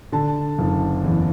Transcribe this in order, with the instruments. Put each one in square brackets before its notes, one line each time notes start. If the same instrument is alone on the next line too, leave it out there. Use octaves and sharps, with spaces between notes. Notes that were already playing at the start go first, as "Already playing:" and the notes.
[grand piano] D3 A5
F#1
E2